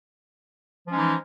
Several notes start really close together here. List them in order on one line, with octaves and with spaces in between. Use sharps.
F3 C#4 G#3 D#4 E3